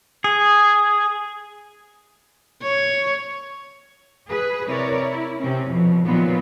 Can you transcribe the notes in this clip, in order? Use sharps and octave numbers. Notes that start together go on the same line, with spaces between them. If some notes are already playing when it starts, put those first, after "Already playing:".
G#4
C#5
G#4 B4
C3 E4 A#4 C#5 D5
E4
C3 C4 C#4
F2 B2 F3
A#2 D#3 F3 F#3 B3 F4